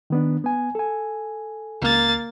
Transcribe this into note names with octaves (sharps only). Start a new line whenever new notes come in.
D#3 B3 D4
B3 G#5
A4 G#5
C#2 A#3 A6